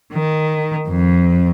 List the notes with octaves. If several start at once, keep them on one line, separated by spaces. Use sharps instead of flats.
D#3
F2